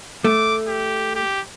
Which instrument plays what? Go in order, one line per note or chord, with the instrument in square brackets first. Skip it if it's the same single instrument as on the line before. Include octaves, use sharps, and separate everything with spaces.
[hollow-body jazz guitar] A3 [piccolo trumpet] D6
[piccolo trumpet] G4
G4